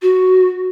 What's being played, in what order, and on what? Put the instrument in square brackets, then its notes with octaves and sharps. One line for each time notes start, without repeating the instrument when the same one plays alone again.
[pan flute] F#4